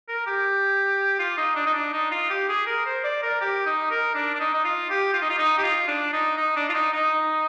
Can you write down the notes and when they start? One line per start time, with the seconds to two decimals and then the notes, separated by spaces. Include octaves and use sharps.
0.08 A#4
0.27 G4
1.19 F4
1.38 D#4
1.56 D4
1.66 D#4
1.74 D4
1.93 D#4
2.11 F4
2.30 G4
2.49 G#4
2.67 A#4
2.86 C5
3.04 D5
3.22 A#4
3.41 G4
3.66 D#4
3.91 A#4
4.15 D4
4.34 D4
4.40 D#4
4.53 D#4
4.64 F4
4.90 G4
5.14 F4
5.22 D#4
5.30 F4
5.38 D#4
5.58 G4
5.64 F4
5.88 D4
6.13 D#4
6.37 D#4
6.56 D4
6.69 F4
6.74 D#4
6.93 D#4